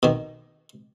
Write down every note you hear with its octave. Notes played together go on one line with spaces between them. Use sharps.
B2 D#3